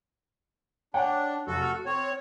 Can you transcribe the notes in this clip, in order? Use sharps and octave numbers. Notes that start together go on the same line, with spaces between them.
D4 C#5 F#5 G5
F1 F#4 A4
F6
C4 C#5